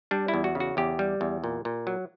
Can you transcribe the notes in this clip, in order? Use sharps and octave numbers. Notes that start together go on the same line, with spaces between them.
G3 D4
E4
E2
F#4
C#3
F#4
E2 G4
G3
E2
A#2
A#2
F#3